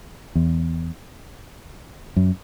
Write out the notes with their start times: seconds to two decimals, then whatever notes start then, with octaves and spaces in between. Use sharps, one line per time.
0.35 E2
2.16 F#2